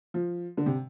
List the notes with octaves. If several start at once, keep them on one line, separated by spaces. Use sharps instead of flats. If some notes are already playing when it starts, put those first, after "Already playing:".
F3
D3
C3